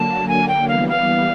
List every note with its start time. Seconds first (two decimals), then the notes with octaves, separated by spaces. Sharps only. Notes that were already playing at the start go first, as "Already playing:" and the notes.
Already playing: D3 F#3 A#3 A5
0.28 G#5
0.48 G5
0.68 E3 G3 B3 F5
0.88 F5